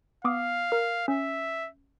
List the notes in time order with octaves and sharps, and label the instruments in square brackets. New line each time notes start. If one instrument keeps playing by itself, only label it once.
[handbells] B3 D6 D#6 [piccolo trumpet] F5
[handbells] A#4
[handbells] C#4 [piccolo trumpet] E5